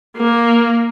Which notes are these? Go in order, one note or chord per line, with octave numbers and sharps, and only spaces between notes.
A#3